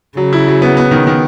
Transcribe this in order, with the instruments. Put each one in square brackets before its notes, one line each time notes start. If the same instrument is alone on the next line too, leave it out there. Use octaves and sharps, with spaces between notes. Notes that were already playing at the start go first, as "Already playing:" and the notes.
[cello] C#3 [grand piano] F#3
[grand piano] E4
F#3
B3
B3
D#3
D#3